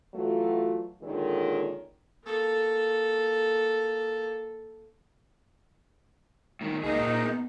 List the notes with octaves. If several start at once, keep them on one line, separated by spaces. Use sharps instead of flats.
E3 F#3 A3 F4 F#4
A#2 D3 D#3 G#3 C#4
A#3 A4
A2 D#3
C#2 A#3 D#4 G#4
A#2
B3